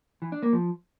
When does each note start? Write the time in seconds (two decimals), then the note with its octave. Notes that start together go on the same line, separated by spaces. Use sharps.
0.22 E3
0.32 D4
0.42 A#3
0.53 F3